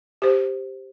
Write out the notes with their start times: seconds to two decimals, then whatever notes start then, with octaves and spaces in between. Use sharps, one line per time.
0.22 G4 C5